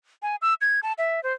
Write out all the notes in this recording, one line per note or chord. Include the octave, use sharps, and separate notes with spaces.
G#5
E6
G#6
A5
E5
C5